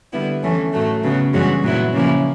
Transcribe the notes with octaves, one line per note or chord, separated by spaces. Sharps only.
D3 G3 B3 E4
E3 A3 C#4
A2 F#3 A3
C#3 F#3 B3
G2 E3 G#3 C#4 F#4
A#2 F#3 B3 E4
C#3 F3 A#3 C#4 E4